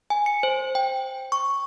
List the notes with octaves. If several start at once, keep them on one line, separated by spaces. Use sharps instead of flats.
G#5
C#7
C5
G5
C#6